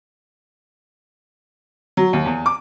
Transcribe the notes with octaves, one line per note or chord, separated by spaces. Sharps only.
F#3
D#2
E2
D6